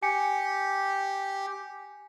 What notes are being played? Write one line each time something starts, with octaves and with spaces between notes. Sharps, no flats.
G4 G#5 C#7